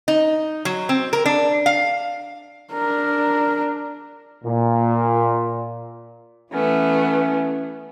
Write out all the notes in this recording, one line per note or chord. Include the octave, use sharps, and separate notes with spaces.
D#4
F#3
C4
A#4
D4
F5
D4 A#4
A#2
E3 A3 B3 C#4